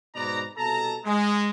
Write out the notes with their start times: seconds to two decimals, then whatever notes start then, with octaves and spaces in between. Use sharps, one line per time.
0.15 G#2 B2 D#4 B4 D5 A#5
0.57 C2 B2 A4 A5 A#5
1.06 G#3